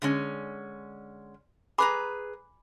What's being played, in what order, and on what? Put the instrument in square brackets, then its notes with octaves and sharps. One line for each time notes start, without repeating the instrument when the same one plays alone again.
[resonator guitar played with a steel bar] D3 G#3 C#4
[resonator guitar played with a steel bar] G#4 B4 A#5 [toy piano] G#5 B5 D6